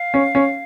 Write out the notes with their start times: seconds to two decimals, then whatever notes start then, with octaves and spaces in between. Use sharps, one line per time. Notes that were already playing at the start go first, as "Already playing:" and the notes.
Already playing: F5
0.14 C#4
0.35 C#4